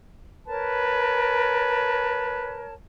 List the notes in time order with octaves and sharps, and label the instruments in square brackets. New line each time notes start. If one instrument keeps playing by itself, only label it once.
[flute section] A#4 C#5 A5 [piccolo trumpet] B4